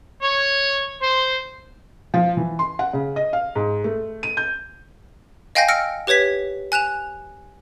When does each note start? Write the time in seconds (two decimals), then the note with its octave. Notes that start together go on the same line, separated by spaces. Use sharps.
0.22 C#5
1.01 C5
2.14 F3
2.37 E3
2.59 C6
2.79 F#5
2.93 C#3
3.16 D#5
3.33 F5
3.55 G#2
3.84 A3
4.23 D#7
4.37 G6
5.55 D#5 F5 G5 G#5 G6 A#6
5.68 E6 F6 A#6 C#7 D7
6.07 G4 B4 C#5 G#6 B6
6.72 G#5 F#6 E7 F7